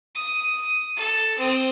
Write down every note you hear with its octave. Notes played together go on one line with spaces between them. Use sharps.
D#6
A4
C4 D#6